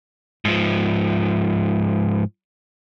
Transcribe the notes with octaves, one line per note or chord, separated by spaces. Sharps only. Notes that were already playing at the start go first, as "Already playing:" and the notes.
G#2 F3